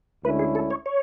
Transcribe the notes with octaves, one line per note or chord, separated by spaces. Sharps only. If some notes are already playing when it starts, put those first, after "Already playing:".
D2 D3 G#3 C#4 E4 B4
G#4
A4
C#5
C#5